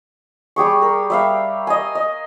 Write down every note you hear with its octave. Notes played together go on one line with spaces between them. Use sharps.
G3 G4 G#4 C#6
A#4
G3 E5 F5
D#5 G#5
D#5